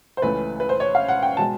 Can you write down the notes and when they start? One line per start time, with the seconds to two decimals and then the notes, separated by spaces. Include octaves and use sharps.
0.17 C5
0.22 C#2 C#3 E3 A3 B4
0.60 B4
0.69 C5
0.80 C#5
0.95 F5
1.08 F#5
1.23 G5
1.37 B2 G#3 A5